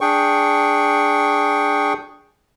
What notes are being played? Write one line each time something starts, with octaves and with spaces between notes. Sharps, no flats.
D4 G#4 G5 C#6